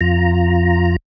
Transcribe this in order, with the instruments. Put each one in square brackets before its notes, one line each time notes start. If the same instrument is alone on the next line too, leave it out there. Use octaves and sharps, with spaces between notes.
[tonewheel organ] F2 F4 A#5